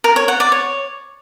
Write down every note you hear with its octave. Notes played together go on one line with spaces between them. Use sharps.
A#4
C#5
F#5
D5
C#5